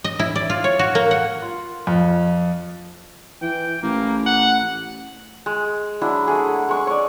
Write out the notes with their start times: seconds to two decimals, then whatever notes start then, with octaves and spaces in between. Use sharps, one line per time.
0.04 D#5
0.19 E4
0.36 D5
0.50 F4
0.64 C#5
0.79 F#4
0.95 A#3
1.11 F#5
1.42 F4
1.87 F2
3.42 E3 G5
3.83 A1 A#3
4.26 F#5
5.46 G#3
6.01 F#3 G#3 D4 E4
6.28 F#3 A3 G#4
6.69 G#3 C#6
6.87 C#5 D5